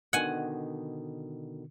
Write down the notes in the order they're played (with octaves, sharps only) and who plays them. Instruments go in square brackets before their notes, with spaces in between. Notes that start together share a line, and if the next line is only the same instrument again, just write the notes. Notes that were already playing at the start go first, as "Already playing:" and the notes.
[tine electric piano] B2 D3 D#3 [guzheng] F#5 G#5